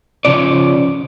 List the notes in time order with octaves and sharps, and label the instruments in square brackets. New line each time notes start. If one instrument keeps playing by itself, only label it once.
[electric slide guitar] C#3 F3 C#4 D5